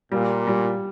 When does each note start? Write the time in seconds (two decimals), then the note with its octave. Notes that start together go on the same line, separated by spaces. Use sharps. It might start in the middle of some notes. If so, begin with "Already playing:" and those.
0.12 A#2 G3
0.47 G3